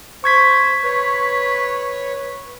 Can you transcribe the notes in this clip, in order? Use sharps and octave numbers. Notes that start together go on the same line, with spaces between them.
C5 C#6 G#6 B6
B4 C#5